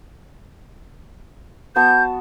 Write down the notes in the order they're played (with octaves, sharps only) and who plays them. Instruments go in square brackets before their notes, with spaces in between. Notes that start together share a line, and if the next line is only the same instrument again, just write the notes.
[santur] B3 F#4 A5 [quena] G6